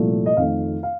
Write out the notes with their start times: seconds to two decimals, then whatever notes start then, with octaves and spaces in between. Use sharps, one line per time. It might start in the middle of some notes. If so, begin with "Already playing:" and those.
Already playing: C2 A#2 F3 A3
0.26 D#5
0.37 F2 D#3 A3 F5
0.83 F5